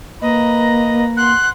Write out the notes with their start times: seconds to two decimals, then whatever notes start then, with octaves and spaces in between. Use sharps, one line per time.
0.22 A#3 B4 D#5 A#5
1.17 F#5 C6 F#6